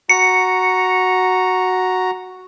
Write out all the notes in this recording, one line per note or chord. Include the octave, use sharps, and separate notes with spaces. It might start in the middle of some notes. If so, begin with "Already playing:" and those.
F#4 A#5 C#7